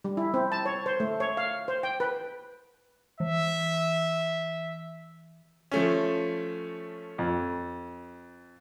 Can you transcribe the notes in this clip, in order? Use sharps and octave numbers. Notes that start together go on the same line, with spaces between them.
G3
E4
C4
A5
C#5
C5
A3
C#5
F5
C5
G5
B4
E3 E5
F3 A3 C#4
F2